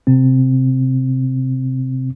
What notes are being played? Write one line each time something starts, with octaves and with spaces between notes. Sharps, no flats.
C3 C4